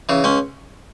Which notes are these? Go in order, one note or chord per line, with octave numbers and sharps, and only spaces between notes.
C#3 E3
C#2 C#4